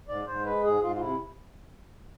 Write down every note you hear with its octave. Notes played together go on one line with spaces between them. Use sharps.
G#2 D5
G#2 C5
G#3 B4
G#2 G#4
G#2 F4
F4
C3 E4